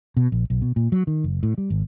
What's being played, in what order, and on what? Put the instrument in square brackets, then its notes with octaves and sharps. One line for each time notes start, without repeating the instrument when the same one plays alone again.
[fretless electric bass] B2
A#1
B1
B2
A#2
F#3
D#3
F#1
A2
G3
G#1